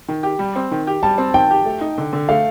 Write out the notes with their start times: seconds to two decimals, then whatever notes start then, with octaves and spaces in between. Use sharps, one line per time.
0.08 D#3
0.23 G4
0.39 G3
0.56 C4
0.71 D#3
0.87 G4
1.03 G3 A5
1.18 C4
1.34 D#3 G5
1.50 G4
1.65 A3
1.81 D#4
1.98 D3
2.13 D3
2.29 A3 F5